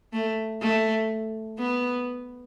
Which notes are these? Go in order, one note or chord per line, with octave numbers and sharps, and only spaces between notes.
A3
A3
B3